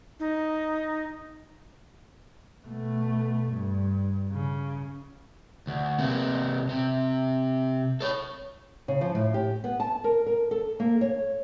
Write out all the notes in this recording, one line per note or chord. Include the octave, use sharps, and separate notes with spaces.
D#4
B2 A3
G2
C#3
D2
C3 A#3
C3
A4 C#5
C#3
F3
A2
G4
B3
A5
A#4
A#4
A4
A#3
C#5